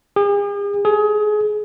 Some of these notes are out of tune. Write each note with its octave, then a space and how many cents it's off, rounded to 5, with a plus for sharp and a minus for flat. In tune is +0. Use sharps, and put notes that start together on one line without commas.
G#4 -45
G#4 +25